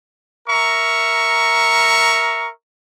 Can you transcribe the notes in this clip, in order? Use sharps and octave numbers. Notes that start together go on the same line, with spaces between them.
A#4 E5 A#5 C#6